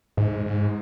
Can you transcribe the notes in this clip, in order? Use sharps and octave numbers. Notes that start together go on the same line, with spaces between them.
G#2
G#2